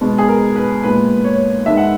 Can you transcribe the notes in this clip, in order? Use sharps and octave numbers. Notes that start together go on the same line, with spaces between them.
B2 G#3 B3
G#4
A#4
B4
A#2 G#3 B3 B4
C#5
D#3 G#3 B3 E5
F#5